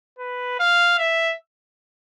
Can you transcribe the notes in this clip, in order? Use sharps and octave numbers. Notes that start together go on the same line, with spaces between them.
B4
F5
E5